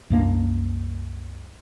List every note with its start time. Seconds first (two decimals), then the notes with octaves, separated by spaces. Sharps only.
0.10 C2 F#2 A#3 D4